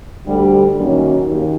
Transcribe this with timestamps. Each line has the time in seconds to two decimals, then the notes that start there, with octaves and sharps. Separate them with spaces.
0.25 D2 D3 G3
0.77 F#2 D#3 F#3 A#3 C#4
1.28 D#2